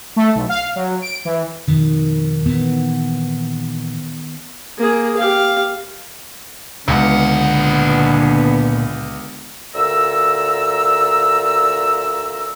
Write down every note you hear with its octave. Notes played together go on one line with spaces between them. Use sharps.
A3
B1
F5
F#3
D7
E3
F2 B2 D#3
A#2 E3 B3
A#3 G#4
G4 F5
C#2 A#2 D3 B3 F#5
D2 A#2 A#5 E6